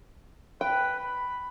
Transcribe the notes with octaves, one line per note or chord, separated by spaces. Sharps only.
B4 G5
B5